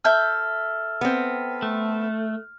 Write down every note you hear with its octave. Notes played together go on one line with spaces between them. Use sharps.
A4 E5 F6 G6
B3 C4
A3